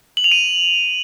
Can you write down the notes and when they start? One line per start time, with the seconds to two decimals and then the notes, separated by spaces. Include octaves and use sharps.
0.17 F#7
0.24 F7
0.32 D#7